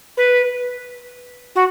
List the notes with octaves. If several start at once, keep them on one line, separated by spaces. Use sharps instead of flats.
B4
F#4